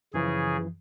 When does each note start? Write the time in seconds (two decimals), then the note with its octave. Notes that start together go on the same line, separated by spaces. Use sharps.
0.14 F#2 C#3 E3 F3 G#4